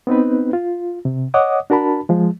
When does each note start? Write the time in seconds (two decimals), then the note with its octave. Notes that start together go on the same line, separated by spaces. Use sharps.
0.07 B3 C4 D#4 B4
0.53 F4
1.05 C3
1.34 C#5 D#5 F#5 D6 D#6
1.70 D4 F#4 A#4 A5 B5
2.09 F3 G#3